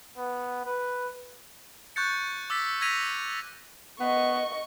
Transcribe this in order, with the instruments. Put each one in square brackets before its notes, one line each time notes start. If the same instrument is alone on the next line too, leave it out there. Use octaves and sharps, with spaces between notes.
[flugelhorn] B3
B4
[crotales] C#6 F#6 G6 A6 C#7
D6 E6 A6 B6
E6 G#6 A#6 B6 D#7 F7
[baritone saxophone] B3 [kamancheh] D#5 C#6